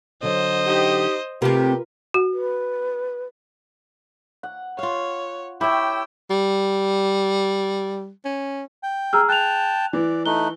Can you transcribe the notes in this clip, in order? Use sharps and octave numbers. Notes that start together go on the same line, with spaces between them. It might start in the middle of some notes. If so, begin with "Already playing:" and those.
D3 F#3 C5 D#5
D#4 G4
C3 A3 F4 G4 A#4 B4
F#4
B4
F#5
F4 C#5 F5
E4 G4 C#5 E5 G5 E6
G3
C#4
G5
G#4 A#5 E6 F6
G5 A5 F#6 F7
E3 D5
A3 D#4 F#6 G7